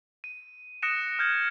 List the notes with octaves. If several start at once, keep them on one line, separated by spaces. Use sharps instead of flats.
D#7
D#6 F#6 A#6 C#7 D7 E7
F6 G6 G#6